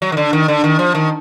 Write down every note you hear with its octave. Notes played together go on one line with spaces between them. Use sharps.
F#3
D#3
D3
D#3
D3
D#3
F3
D#3